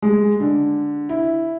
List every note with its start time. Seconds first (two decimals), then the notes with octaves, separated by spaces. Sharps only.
0.02 G#3
0.40 D3
1.09 E4